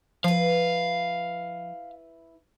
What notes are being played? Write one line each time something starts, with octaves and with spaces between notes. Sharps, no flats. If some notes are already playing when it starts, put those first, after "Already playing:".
F3 E4 B4 F5